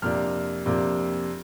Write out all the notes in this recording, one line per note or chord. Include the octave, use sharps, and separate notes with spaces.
F2 C3 A#3 D4 F6
F2 C3 A#3 D4